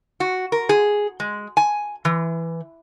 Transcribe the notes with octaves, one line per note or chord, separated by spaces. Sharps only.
F#4
A#4
G#4
G#3
G#5
E3